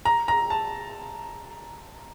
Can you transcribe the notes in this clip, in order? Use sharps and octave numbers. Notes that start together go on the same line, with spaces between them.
A#5
A#5
A5